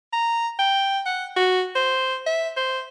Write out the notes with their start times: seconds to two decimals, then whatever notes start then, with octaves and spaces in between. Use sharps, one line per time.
0.13 A#5
0.59 G5
1.06 F#5
1.36 F#4
1.75 C5
2.26 E5
2.57 C5